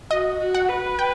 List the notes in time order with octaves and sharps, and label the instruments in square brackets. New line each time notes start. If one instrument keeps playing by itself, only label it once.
[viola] F#4 [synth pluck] D#5
[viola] F#4
[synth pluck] F#5
[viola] B4
[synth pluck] G5